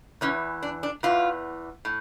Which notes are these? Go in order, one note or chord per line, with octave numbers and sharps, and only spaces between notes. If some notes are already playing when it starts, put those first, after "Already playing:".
E2 E3 C#4
D4
D4
E2 E3 F4
A2